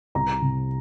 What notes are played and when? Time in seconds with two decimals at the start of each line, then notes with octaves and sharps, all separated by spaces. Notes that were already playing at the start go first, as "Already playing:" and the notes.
0.15 C2 A#5
0.42 C3